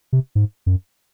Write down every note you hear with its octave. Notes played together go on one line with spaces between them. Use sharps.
C3
G#2
F#2